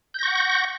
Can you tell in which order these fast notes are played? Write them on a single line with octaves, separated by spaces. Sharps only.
G6 A#6 C#6 F#5